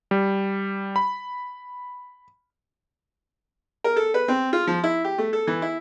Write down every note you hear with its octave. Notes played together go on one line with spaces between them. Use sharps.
G3
B5
A#4
A4
B4
C4
F4
F3
E4
G4
A3
A4
E3
E4